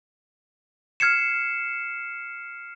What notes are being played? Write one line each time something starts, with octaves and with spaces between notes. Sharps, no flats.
F6 G#6 C7 C#7 E7